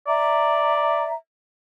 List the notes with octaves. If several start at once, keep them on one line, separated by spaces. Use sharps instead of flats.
D5 E5 A#5